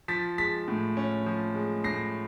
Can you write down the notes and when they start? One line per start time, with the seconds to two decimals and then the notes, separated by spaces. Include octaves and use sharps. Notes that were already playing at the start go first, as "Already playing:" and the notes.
0.08 F3 A6 B6
0.38 G#3 A6 B6
0.68 A2
0.97 C#4
1.26 F3
1.55 G#3
1.84 A2 A#6 C7